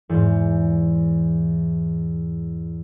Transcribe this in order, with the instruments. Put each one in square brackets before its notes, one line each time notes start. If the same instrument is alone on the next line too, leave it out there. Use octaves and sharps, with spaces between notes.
[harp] E2 G#2